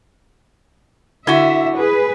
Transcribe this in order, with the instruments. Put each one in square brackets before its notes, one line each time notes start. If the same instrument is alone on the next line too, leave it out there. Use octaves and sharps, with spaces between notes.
[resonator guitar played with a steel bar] D3 F#4 [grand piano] E4 G#6 G7 [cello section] E5
[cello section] G#4 B4